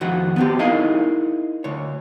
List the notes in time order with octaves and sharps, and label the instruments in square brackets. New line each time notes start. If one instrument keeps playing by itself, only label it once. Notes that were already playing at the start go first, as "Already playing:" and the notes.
[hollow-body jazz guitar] F2 D#3 F#4 F#5
B3 C4 G4
D#4 E4 G#4 A#4 D#5 F5
D2 C#5